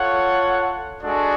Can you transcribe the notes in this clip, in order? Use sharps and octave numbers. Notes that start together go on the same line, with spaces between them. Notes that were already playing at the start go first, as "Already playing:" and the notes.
Already playing: F4 A4 C#5 F#5
G#3 D4 F#4 A4 D5